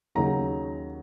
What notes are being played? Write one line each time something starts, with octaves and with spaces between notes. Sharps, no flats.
D#2 C#3 F#3 D#4 A#5